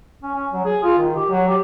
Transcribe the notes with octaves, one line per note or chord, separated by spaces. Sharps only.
C#4
C#4
F#3
G#4
F4
D#3
G4
F#3
G4